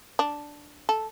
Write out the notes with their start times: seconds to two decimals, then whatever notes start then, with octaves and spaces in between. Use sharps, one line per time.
0.19 D4
0.89 A4